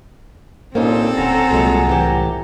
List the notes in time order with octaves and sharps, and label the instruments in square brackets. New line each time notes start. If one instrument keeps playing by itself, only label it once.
[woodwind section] C2 A#2 [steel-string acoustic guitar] A#3 C#4 D#4 [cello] C4 A4
[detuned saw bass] D1 [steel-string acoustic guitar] C#4 [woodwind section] F#5 G#5 A#5
[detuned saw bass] C2 [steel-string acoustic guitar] A#2 F#3 G#3
[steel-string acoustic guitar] A2 E3 G4